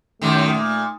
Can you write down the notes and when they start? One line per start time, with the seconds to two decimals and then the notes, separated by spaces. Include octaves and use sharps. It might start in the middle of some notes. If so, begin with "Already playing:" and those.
0.22 F#2 A2 D#3 A3
0.54 A#2